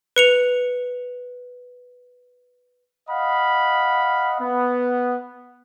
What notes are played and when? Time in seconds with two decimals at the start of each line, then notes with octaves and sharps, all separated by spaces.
0.16 B4 C#7 F7
3.09 D#5 F5 F#5 B5
4.41 B3